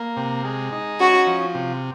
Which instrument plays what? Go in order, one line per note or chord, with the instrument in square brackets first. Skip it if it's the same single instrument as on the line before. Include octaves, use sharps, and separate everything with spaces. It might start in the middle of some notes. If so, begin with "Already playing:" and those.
Already playing: [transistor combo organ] A#3
C3
G#3
D#4
[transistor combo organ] C#4 [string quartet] F#4
[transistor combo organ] F3
C3